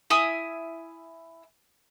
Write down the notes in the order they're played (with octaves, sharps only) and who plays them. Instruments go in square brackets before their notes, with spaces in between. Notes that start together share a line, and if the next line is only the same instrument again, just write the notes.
[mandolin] E4 E5 G#5 D#6